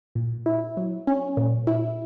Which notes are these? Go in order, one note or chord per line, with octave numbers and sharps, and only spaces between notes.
A#2
E4
F#3
C#4
A#2
E4